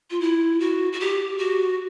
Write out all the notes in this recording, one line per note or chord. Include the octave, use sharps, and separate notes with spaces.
F4
E4
F#4
F#4
G4
F#4